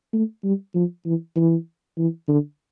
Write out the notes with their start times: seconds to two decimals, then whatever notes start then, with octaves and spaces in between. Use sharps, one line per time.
0.13 A3
0.44 G3
0.75 F3
1.06 E3
1.36 E3
1.98 E3
2.28 D3